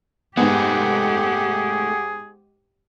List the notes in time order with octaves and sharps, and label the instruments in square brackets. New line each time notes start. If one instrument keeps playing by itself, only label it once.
[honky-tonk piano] G#2 B3 [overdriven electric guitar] A3 D#4 [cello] G4 F#5 [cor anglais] G#4